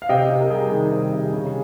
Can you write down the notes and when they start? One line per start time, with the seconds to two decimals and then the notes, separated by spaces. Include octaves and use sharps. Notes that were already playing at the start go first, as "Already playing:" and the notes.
0.02 F5
0.09 C3 D#5 G5
0.30 C3
0.40 A#4
0.50 G3 G#4
0.70 D#3 G#4
0.92 C3
1.13 C3
1.33 C#3